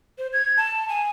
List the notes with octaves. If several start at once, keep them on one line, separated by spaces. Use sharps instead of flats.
C5
G#6
A5
G#5